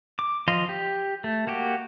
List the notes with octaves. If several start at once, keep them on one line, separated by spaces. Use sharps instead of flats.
D6
F3 D#5 F5 C6
G4
A3
A#3 F#4 G4